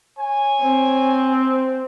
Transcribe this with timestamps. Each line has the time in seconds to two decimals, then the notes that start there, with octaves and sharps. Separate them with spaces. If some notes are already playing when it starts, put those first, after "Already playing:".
0.18 C#5 G#5
0.61 C4